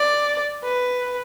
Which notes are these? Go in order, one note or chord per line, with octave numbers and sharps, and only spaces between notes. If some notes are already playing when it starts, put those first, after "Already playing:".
Already playing: D5
B4